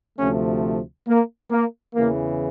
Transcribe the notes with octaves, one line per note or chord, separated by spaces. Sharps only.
D2 C3 F3 A3 C#4
A#3
A#3
E2 C#3 E3 A#3